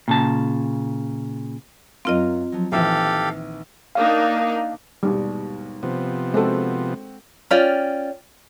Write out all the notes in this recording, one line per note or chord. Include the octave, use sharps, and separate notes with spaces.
A#2 C#3 A5
F#2 C4 F4 A#4 D#5 F5
F3 F#3
A#1 D#3 E3 G4 A4 E5 F5 G#5
A#3 D4 D#4 F5
D#2 G#2 B2 G3
C3 F3 B3
G#3 C4 F#4 A4
C#4 F4 D5 G5